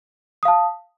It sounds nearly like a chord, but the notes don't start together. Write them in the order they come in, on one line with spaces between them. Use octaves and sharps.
D#6 F5 A5